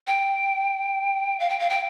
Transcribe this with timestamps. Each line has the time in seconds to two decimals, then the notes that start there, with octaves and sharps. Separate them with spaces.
0.07 G5
1.40 F5
1.49 G5
1.59 F5
1.69 G5